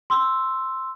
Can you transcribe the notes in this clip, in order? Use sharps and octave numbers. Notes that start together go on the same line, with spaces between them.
C6 E6